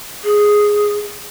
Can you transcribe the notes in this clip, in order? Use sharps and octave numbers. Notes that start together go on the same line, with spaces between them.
G#4